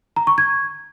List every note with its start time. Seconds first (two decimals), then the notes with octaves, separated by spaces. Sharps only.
0.16 A#5
0.27 C#6
0.38 G#6